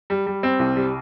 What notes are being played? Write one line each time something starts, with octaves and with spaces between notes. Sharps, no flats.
G3
G3
C4
C2
G3